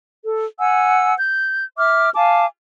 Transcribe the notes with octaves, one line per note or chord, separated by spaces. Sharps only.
A4
F#5 G#5 E6
G6
E5 D6 F6
F5 G#5 A5 D6